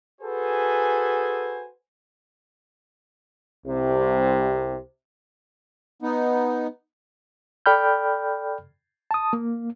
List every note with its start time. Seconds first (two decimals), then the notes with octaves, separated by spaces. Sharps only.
0.21 F#4 G#4 A4 B4 C5 G#5
3.66 C2 C3
6.02 B3 D#4
7.66 A4 D5 G5 B5 F6 G6
9.11 A5 D#6
9.33 A#3